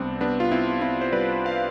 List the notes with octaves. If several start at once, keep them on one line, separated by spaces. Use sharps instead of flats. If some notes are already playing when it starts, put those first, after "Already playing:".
Already playing: C2 G3 B3 C4 D4
G3 B3 D4
F4
C4 E4
B3
C4 E4
C5
G3 B4 D5
F5